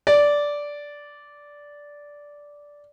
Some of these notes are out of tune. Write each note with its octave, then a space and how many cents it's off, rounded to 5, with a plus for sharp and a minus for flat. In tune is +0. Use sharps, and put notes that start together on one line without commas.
D5 -10